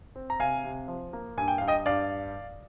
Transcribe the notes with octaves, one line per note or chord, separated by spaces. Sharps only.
C4
A#5
C3 F5 G#5
C3
F3
A#3
G2 G#5
G5
G2 F5
D#5 G5
G2 D5 F5